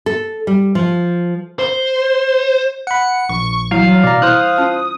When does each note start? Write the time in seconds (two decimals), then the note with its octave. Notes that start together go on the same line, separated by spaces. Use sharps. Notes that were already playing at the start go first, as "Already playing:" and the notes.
0.06 A4
0.47 G3
0.75 F3
1.59 C5
2.87 F#5 B5 C#7
3.29 A#1 C#6
3.71 E3 F#3 G3 E4 F5
4.04 B2 D5 A#5
4.22 E4 C5 D#6 F#6
4.58 C#4 F4 A5